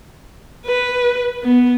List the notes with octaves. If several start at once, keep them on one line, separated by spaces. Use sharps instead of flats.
B4
B3